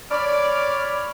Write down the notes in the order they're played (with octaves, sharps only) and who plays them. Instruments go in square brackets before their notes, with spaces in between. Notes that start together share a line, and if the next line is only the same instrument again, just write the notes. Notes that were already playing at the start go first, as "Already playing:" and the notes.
[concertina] C#5 B5 F6 [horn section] D5